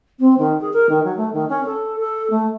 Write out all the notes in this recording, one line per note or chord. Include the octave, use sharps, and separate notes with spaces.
C4
D#3
G#4
A#4
D#3
F#3
A3
D#3
C#4
A4
A4
A3